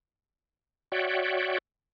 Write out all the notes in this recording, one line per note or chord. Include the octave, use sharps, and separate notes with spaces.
F#4 C#5 D5 E5 F#5 G5